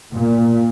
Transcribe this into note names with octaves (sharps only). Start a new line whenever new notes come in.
A#2